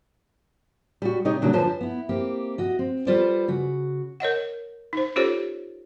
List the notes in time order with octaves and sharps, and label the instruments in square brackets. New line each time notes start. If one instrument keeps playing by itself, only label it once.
[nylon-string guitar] G3 F#4
C3 G3 D#4 G4 C#5 D#5
C#3 F#3 G3 A#3 D4
F#2 D3 F3 B4 C5 A5
[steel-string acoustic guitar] B3 E4
A#3 C4 G4
F#4 D#5
C4
G3 F4 A4 B4 C5 D5
C#3 F#4
[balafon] A#4 C#5 D#5 F#5
D#4 C5
C#4 F4 G4 A4 C5 C#5